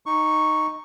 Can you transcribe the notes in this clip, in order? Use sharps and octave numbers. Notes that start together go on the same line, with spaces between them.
D#4 C#6